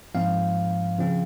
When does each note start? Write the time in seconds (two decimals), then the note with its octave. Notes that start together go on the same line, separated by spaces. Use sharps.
0.15 G#2 F3 C4 F5
0.99 C#3 F3 C4